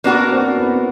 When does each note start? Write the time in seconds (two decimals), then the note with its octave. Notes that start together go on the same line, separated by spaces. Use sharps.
0.04 A#3 B3 D4 F#4 A#4
0.32 C4
0.58 B3